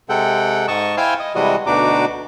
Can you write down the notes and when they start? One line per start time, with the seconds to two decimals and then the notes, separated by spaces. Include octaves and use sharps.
0.09 C3 G#3 A4 F#5 G5
0.68 G#2 D#5 A5 C#6
0.97 E4 C5 F5 G5 G#5 C6
1.20 D#5
1.35 C3 E3 G3 G#3 F#4 D#5
1.67 D2 B2 D4 D#4 F#4 D6